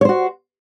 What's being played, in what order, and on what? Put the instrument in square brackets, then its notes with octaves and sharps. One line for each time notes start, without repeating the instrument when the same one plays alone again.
[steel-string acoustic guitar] C#5
C5
F#4